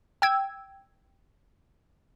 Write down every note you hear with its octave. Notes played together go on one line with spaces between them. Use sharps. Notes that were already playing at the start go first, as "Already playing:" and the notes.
G5 E6 G#6